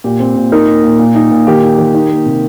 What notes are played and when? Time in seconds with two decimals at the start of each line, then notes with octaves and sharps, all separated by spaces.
0.04 A#2 G4
0.20 C4
0.36 A#2
0.52 D#4 A#4
0.68 A#3
0.84 A#2
0.99 A#2
1.15 D#4
1.32 A#2
1.47 D#3 G4
1.62 D#4
1.78 D#3
1.94 D#4
2.11 A#3
2.26 C3